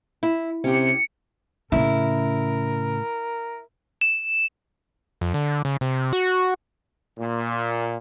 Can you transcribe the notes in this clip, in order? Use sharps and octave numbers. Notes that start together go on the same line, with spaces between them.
E4
C3 C#4 G4 C#7
A2 C#3 C#4 E4 A#4
E7
F2
D3
C#3
C3
F#4
A#2